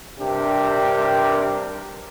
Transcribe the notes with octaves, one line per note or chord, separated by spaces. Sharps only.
G2 C3 D4 G4 A#4